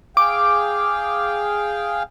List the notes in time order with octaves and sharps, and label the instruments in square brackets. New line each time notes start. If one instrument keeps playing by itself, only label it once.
[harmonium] G#4 F5 G5 [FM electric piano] D6